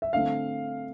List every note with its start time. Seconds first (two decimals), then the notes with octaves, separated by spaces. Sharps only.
0.02 E5
0.13 D3 A3 C4 F5